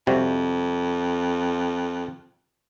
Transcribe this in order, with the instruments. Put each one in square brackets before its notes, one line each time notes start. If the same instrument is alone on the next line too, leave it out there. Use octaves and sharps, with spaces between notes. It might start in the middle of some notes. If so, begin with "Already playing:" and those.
[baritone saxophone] F2 [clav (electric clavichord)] C3 G3 F#4